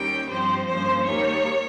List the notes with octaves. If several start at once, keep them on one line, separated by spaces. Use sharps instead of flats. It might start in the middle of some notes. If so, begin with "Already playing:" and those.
Already playing: D#2 D#3 G3 C#4 G5
G2 F3 C4 C5
G2 F3 A#3 C#4 C5
D#2 D#3 G3 A#3 C#5